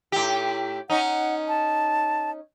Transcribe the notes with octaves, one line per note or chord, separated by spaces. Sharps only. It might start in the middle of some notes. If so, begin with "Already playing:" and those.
A2 G4
C#4 D#4 F#5
A5